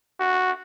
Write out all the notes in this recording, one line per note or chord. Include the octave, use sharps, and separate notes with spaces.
F#4